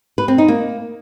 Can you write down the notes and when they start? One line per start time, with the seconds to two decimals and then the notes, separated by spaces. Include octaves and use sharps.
0.18 B4
0.28 C4
0.38 D#4
0.48 A#3